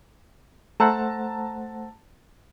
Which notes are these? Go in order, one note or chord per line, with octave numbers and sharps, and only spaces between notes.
A3 C5 F#5 A5 A#5 E6